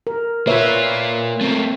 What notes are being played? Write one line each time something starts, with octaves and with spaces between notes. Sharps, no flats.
A#4
A#3 F4 B4 C#5 E5
A3 A#3 C4